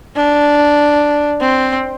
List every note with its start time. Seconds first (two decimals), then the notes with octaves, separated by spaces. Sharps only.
0.16 D4
1.41 C4